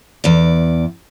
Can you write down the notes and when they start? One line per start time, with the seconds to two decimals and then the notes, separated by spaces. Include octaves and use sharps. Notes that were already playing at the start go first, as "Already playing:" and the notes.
0.24 E2 D5